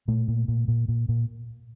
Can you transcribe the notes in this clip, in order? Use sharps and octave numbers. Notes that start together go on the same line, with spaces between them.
A#2 A3
A#2
A#2
A#2
A#2
A#2